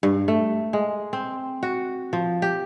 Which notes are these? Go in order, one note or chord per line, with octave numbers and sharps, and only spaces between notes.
G2
A3
G#3
C4
F#4
F3
G4